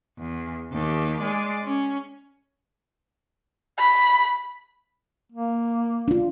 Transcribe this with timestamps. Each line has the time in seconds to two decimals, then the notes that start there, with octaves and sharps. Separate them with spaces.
0.19 E2
0.73 D#2 G4
1.21 G#3 D5
1.64 C#4
3.79 B5
5.32 A#3
6.08 D4 F4